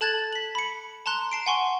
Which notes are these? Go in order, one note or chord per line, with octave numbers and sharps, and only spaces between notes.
A4 A5 F#6 G#6 A6 F#7
B6 F#7
B5 C#7
A5 A#5 C6 F#6
A5 C7 D7
F#5 G#5 C6 C#6